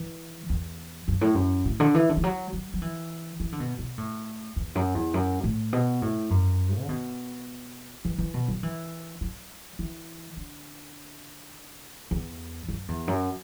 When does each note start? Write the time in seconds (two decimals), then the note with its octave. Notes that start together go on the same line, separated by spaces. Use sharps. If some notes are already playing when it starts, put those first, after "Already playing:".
Already playing: E3
0.50 E2
1.08 F#2
1.21 A2
1.35 F#2
1.65 A2
1.80 D3
1.94 E3
2.09 D3
2.17 E3
2.24 F#3
2.53 F#3
2.74 F#3
2.82 E3
3.40 E3
3.53 D3
3.60 B2
3.79 B2
3.98 A2
4.56 E2
4.75 F#2
4.95 E2
5.14 F#2
5.44 A2
5.73 B2
6.02 A2
6.30 F#2
6.81 D3
6.89 B2
8.05 E3
8.18 E3
8.34 B2
8.48 F#3
8.63 E3
9.21 F#3
9.79 E3
10.37 D3
12.11 E2
12.69 F#2
12.88 E2
13.08 F#2